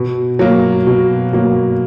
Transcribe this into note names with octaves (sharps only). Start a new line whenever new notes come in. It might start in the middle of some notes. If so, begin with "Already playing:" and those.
Already playing: B2
F#3 A#3
B2
F#3 A#3